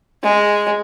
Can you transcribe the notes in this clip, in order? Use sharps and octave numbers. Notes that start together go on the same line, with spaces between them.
G#3